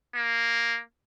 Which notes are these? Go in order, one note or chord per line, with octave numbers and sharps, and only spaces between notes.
A#3